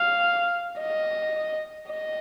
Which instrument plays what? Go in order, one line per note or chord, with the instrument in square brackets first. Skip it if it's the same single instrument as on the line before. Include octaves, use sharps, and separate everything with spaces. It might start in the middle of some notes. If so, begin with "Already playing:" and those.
Already playing: [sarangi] F5
D#5
D#5